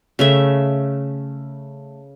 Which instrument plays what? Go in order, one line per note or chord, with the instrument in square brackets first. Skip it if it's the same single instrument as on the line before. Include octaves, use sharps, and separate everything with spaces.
[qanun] C#3 A3 E5